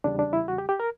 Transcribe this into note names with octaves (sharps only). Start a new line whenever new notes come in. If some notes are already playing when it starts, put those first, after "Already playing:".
E2 C#3 G3 D4
D4
E4
F#4
G4
G4
A#4